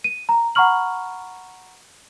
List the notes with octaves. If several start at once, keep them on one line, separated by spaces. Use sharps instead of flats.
D#7
A#5
F#5 A#5 B5 C#6 F6 F#7